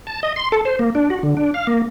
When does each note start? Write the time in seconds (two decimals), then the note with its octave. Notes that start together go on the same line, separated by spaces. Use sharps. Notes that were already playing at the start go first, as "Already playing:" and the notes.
0.07 A5
0.23 D#5
0.36 C6
0.52 A4
0.65 C5
0.79 A#3
0.95 D4
1.10 F#4
1.23 D3
1.37 D4
1.54 F5
1.67 A#3